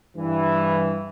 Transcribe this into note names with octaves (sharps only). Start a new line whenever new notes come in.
G2 E3